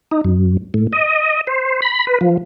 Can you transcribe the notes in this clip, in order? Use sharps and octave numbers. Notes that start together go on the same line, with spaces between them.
D#4
F#2
A2
D#5
C5
B5
B4
F3